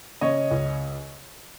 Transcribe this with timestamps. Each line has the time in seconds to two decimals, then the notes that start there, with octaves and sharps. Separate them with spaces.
0.21 C#3 C#5 D#5
0.51 C#2